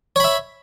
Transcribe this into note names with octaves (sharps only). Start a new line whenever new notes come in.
C#5 E5 B5